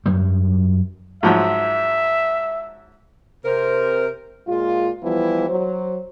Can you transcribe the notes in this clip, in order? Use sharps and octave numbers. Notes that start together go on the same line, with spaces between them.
F#2 F#3 G3
G#2 F3 F#3 E5
C3 A#4 C5
A#2 G#3 F4
E3 F3 G3 B3 E4
F#3 C5